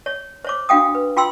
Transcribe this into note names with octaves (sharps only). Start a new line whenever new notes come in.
C#5
C5 C#5 D6
D4 F#4 F5 G5 D#6
B4
F4 G5 C6 E6